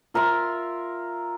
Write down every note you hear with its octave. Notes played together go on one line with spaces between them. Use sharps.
F4 A#4 E5 C6